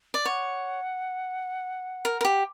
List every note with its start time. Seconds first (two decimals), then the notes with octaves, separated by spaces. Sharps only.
0.14 D5
0.25 C#5 F#5
2.05 A#4
2.21 A#4
2.25 G4